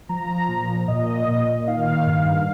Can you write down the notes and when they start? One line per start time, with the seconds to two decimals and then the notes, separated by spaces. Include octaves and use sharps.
0.09 F3 A#5
0.48 A#2
0.88 A#2 D#5
1.28 A#2
1.67 D#3 F5
2.07 G2